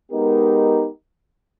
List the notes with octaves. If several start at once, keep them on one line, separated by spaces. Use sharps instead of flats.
G#3 B3 D#4 G4 A#4